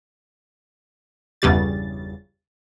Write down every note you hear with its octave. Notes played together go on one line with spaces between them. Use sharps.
G1 E2 C#3 G3 A6